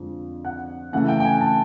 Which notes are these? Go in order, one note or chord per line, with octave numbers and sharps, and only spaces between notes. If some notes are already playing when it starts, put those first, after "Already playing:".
Already playing: F2 D3 F3 G#3
F#5
C#3 E3 A3 F#5
G5
G5
G#5
A5